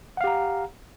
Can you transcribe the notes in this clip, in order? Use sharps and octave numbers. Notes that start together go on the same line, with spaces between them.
G4 F5 F#5 A#5